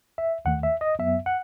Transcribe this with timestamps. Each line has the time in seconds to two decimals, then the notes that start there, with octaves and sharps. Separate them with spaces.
0.18 E5
0.45 D#2 D#3 A3 F#5
0.63 E5
0.81 D#5
0.99 F#2 F#3 B3 E5
1.26 F#5